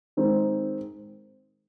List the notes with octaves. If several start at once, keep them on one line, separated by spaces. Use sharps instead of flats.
D#3 G#3 C4 D#4